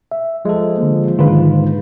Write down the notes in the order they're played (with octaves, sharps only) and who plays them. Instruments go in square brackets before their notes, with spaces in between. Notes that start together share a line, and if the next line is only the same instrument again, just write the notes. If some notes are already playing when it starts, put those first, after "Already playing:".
[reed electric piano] E5
[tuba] F3 [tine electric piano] G#3 A4
[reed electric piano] D3 A#3
[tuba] G#2 [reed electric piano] D3 D#3 B4 [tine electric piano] F4